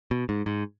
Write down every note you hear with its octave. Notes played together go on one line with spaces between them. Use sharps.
B2
G#2
G#2